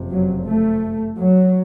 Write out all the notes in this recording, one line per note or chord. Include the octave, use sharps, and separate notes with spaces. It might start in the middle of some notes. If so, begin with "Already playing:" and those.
Already playing: F#1 F2 C3
F#3
A3
F#3